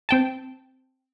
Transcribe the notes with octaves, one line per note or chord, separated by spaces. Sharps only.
C4 G5 A5